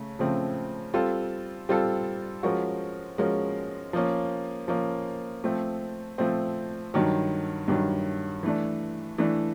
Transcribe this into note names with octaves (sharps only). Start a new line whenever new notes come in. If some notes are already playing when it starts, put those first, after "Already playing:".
Already playing: C#3 A3
C#3 F3 A3 C4
G3 C4 F4 A4
G3 C4 F4 A4
F3 G#3 C#4 F#4 A#4
F3 G#3 C#4 F#4 A#4
F3 A#3 C#4
F3 A#3 C#4
F3 A3 C4
F3 A3 C4
G2 D#3 F#3
G2 D#3 F#3
E3 A3 D4
E3 A3 D4